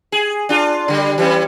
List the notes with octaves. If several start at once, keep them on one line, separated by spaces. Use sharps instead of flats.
G#4
D4 F4
D3 G3
E3 G3 C#4